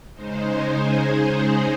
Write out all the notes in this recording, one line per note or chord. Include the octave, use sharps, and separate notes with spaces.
C#3 G#3 D#4 C5
G#4